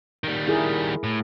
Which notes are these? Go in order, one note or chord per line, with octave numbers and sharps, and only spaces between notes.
D#3 G3
E4 G#4 A#4
A2